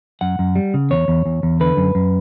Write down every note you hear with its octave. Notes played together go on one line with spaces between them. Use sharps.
F#2 F#5
F#2
G3
C#3
E2 C#5
E2
E2
E2
D3 B4
F#2
F#2